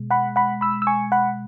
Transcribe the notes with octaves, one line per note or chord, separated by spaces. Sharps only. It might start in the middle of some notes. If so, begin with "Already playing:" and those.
Already playing: B2 G#3
F#5 B5
F#5 B5
B5 E6
E6
G#5 C#6
F#5 B5